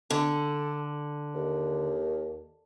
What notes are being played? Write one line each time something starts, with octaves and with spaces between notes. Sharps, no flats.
D3 A4
D#2